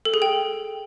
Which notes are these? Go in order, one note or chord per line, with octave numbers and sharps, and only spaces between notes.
A4
G#4
G5